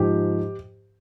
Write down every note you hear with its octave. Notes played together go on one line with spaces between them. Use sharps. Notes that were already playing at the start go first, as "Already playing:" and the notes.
Already playing: G#2 F3 G4